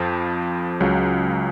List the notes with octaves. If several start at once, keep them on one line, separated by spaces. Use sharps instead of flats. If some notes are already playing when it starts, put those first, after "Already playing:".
Already playing: F2 F3
C#2 C#3 F#3